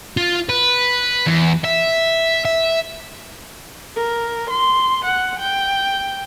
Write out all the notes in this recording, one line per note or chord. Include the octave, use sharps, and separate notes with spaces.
F4
B4
E2
E5
E5
A#4
C6
F#5
G5